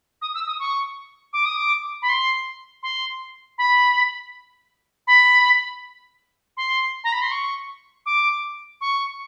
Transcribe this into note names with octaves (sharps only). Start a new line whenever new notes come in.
D#6
E6
D#6
C#6
D6
D#6
D6
B5
C6
C6
B5
B5
C6
A#5
B5
C6
C#6
D6
C#6